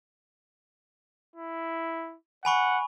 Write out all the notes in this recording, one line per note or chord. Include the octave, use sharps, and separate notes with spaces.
E4
F#5 G#5 B5 C#6